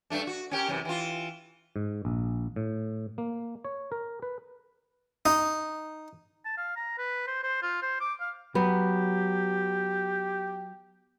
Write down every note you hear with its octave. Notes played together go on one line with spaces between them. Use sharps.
G2 A3 D4
F#4
C#4 G4 A#4
F#2 C3 E3
E3 F4
G#2
A#1
A2
A#3
C#5
A#4
B4
D#4
A5
F5
A#5
B4
C5
C5
F4
C5
D6
F5
F#3 B3 G4